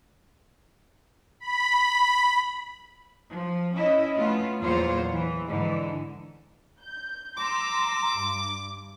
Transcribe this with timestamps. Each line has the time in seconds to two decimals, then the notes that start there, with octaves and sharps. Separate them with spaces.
1.40 B5
3.30 F3
3.74 C#4 E4 D#5
4.16 A3 B3 C#4 F4
4.60 E2 A#2 F#3 F4 C5 C#5
5.12 E3
5.46 G#2 D3 E3
6.80 G6
7.38 A#5 C6 D6 E6
8.16 G2